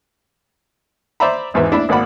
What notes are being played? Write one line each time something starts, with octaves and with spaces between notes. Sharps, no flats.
C5 D5 E5 A#5 B5
G#1 E2 G#2 B4 E5
D4 E4 E5 B5
G#1 A#3 D5 F#5 B5